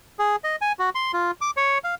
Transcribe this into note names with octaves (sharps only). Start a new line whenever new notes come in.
G#4
D#5
G#5
F#4
C6
F4
D6
C#5
F5